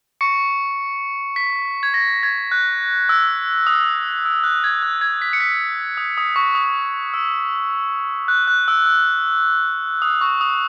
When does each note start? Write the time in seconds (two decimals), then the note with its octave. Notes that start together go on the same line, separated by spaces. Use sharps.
0.21 C#6 C#7
1.36 B6
1.83 G#6
1.94 A#6
2.23 G#6
2.52 F#6
3.09 E6
3.67 D#6
4.25 E6
4.44 F#6
4.64 G#6
4.83 F#6
5.01 G#6
5.22 B6
5.33 C#7
5.40 B6
5.97 D#6
6.18 D#6
6.36 C#6
6.55 D#6
7.14 E6
8.28 F#6
8.47 F#6
8.68 E6
8.86 E6
10.02 D#6
10.21 C#6
10.41 D#6